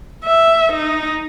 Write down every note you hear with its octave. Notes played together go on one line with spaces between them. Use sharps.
E5
D#4